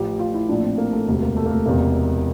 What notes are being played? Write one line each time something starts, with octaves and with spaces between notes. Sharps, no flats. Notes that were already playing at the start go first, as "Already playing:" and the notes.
Already playing: A1 A2 F3 G4
F4
E4
A#1 A2 F3 D4
C4
A#3
A3
E1 D2 C3 A3
A#3
A3
A#3
A3
E1 E2 C3 A#3